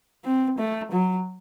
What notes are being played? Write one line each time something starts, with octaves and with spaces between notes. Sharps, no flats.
C4
A3
F#3